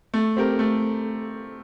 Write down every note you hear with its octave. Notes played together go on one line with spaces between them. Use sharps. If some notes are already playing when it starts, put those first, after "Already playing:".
A3
C4 G4 A#4
A3